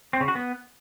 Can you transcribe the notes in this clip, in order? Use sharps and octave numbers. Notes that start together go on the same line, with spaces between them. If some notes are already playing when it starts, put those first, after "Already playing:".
C4
C#3
F#4
B3